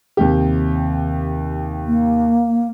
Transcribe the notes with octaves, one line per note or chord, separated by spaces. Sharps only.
D#2 C3 G4
A#3